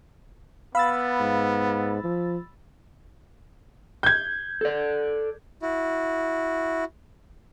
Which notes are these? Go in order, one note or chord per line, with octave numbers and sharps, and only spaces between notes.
B3 F5 B5 E6 A6
G#2
F3
G6 G#6
A4 D5
E4 F#4